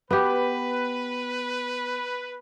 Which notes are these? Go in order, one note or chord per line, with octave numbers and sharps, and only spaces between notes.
B3 G4 B4